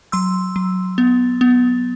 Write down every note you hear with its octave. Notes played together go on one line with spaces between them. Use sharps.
F#3 C6 E6
F#3
B3
B3